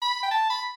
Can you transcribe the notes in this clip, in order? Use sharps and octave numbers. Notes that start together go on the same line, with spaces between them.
B5
G5
A5
B5